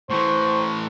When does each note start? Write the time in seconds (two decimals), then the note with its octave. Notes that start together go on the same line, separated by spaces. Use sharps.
0.10 A2 E3 C5 C#6